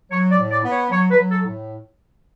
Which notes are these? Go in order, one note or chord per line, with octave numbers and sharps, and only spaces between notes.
F#3 C#5
D5
A2
D5
B3
C#5
F#3 C#5
B4
F#3
A4
A2